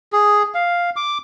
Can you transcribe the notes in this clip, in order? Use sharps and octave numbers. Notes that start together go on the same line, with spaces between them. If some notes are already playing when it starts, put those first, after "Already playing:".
G#4
F5
D6